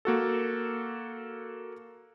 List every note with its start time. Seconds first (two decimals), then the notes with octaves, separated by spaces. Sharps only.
0.05 A#3 F#4 A4